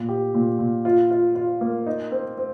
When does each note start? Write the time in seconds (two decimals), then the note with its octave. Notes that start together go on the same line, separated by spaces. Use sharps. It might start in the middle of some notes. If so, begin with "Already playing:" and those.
Already playing: A#2
0.09 G4
0.34 A#2
0.59 A#2
0.85 F4
1.11 F4
1.35 F4
1.61 A#3
1.86 D#4
2.12 C4
2.38 C4